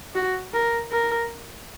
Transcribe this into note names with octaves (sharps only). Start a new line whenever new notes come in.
F#4
A#4
A#4